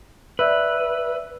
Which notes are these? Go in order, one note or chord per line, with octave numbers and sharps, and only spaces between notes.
B4 D5 E5 E6